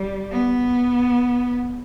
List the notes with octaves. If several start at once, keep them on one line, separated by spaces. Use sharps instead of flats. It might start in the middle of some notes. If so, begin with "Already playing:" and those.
Already playing: G3
B3